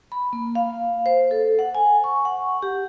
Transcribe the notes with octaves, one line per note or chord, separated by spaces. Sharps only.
B5
A#3
F5
C5
A4
F#5
G#5
C#6
F#5
G4